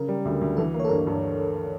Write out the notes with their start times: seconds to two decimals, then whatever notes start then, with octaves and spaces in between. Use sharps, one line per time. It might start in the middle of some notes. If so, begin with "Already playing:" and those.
Already playing: C#3 A#4
0.08 G3
0.25 D2
0.41 D2
0.57 E3 A4
0.74 A#3
0.80 C#5
0.85 A4
0.89 G2 A#4
1.07 G2